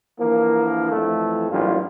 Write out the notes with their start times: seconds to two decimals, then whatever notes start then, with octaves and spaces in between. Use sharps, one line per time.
0.19 D3 E3 F3 A#3
0.91 F2 E3 A3
1.49 A1 G2 A#2 F#3 F4